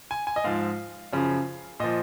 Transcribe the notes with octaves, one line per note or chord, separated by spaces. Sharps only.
G#5
G#5
D#5
G#2 F3 F5
F#2 C#3 F3
A#2 F3 D#5